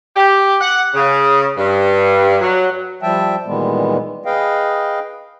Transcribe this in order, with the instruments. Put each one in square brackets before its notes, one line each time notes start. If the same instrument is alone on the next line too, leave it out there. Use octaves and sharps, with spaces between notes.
[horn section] G4
F#5
C#3
G2
F#3
[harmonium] F3 G3 E5 G5 A5
A#2 D#3 E3 G3 G#3 B3
G#4 B4 D#5 F5 G5